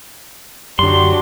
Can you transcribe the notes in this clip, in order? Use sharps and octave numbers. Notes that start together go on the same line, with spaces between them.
F#2 D3 F#3 D4 G4 C6